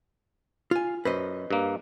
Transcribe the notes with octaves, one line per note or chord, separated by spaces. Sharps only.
F4 G#5
F#2 B4 C5 D#5
G2 A#3